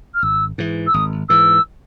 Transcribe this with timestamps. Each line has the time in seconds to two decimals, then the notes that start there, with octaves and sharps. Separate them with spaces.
0.14 F6
0.23 G#1 E6
0.58 G#2 E3
0.87 E6
0.94 G#1 D#6
1.29 G#2 E3 E6